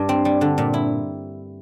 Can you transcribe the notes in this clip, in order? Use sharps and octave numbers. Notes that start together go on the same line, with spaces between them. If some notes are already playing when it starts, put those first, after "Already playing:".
Already playing: G2
C4
G3
D3
A#2
E4